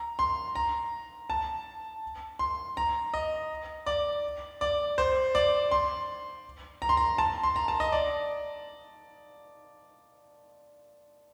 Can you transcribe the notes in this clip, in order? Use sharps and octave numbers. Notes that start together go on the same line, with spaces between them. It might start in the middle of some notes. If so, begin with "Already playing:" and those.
Already playing: A#5
C6
A#5
A5
C6
A#5
D#5
D5
D5
C5
D5
C6
A#5
C6
A#5
A5
C6
A#5
A5
D#5
D5